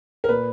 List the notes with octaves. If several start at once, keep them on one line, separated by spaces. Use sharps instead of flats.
A#4
A#2 B4